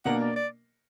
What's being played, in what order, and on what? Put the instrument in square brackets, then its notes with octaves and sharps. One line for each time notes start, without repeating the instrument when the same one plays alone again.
[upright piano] B2 A#3 D4 A#4 [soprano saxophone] F#5
[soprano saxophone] D5
D5